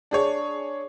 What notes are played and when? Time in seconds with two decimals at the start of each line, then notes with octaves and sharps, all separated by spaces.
0.11 D4 G#4 C#5